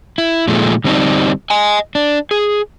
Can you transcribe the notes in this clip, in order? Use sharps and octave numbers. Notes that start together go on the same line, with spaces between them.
E4
A#2 D#3 F3 G#3 A3
D3 G3 C4 D4 D#4
D#5 G#5
D4
G#4